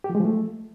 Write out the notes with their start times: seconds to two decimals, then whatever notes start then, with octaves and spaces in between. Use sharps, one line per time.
0.04 G4
0.10 F3
0.15 G#3
0.20 F3
0.25 A3